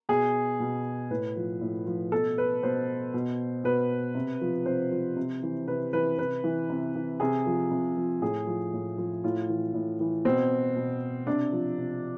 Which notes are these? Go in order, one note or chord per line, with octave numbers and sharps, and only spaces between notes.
B2 G#4
B2
A2 B4
F3
A2
F3
B2 A4
B4
B2 C5
B2
B2 B4
C3
F3
C3 C5
F3
C3
E3
C3 B4
E3 B4
C3 B4
E3
C3
E3
C3 G#4
F3
C3
F3
A2 G#4
F3
A2
F3
A2 F4
E3
A2
E3
B2 C4
B2
C3 D4
F3
C3